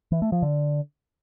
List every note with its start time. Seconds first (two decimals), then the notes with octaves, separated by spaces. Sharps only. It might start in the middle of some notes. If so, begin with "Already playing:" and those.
0.12 E3
0.22 A3
0.32 F3
0.42 D3